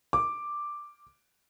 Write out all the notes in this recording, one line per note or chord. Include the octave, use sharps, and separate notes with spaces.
D6